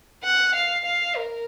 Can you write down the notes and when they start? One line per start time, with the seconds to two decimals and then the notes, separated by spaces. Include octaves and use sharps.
0.23 F#5
0.54 F5
0.85 F5
1.16 A#4